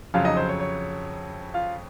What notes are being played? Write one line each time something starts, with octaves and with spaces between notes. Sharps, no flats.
F2 C#3 F#3 F4 F5
D#4 D#5
C5
C#5
C#5
F4 F5